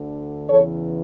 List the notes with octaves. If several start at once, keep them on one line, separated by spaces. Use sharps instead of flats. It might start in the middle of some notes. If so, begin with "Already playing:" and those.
Already playing: D2 D3
E2 C#3 E3 A4 C#5